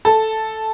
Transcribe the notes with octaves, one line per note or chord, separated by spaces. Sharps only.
A4